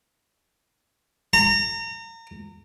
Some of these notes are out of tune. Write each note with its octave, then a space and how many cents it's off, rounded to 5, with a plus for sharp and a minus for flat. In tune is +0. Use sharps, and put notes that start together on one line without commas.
A#5 -35